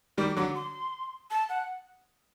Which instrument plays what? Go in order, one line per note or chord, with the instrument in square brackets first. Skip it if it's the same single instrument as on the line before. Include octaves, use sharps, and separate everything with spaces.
[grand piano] D#3 G3 [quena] D6
[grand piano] D3 F#3 [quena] D6
[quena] C6
A5
F#5